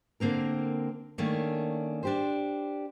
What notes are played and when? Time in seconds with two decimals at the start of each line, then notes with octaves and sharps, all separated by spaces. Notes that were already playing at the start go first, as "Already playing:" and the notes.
0.20 D3 A#3 C4 A#4
1.18 D#3 A3 A#3 C#4 D4
2.03 D4 G4 C5